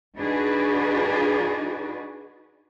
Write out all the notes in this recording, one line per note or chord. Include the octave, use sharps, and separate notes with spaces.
D4 D#4 F#4 G#4 B4 D5